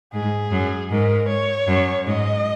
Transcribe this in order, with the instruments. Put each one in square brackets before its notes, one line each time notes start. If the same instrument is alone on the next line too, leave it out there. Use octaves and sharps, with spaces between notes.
[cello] G#2 [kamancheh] G#4
[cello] F#2
[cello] G#2 [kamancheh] A#4
[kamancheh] C#5
[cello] F#2
[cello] G#2 [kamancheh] D#5